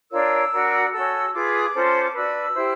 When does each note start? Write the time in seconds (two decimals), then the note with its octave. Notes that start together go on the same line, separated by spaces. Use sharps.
0.12 D4 F4 A#4 C#5 E6
0.52 D4 F#4 A#4
0.93 C#4 F#4 A4 E6
1.33 F4 G#4 B4 D6
1.74 C#4 F4 A4 C5
2.15 D4 F#4 B4 E6
2.55 E4 G4 C5